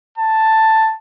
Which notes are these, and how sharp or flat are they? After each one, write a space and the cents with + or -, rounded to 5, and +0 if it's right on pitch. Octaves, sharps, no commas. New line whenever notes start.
A5 +5